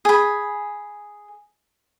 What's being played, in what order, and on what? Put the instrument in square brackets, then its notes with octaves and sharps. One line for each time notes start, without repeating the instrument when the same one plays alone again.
[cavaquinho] G#4 B5